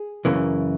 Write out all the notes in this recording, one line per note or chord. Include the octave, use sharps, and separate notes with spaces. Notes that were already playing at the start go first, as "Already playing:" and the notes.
Already playing: G#4
F#2 C#3 E3 A#3